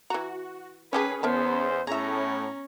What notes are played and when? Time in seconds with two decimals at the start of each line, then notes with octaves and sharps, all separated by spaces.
0.10 E3 F#4 A#5
0.93 D#3 C#4 G4 G#4 B4 A5
1.23 E2 B3 A#4 C5 E5 A5
1.87 A2 C#4 G#4 E5 A#5